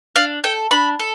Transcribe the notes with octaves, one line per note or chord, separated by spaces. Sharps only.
D4 F5
A4 G5
D4 B5
A4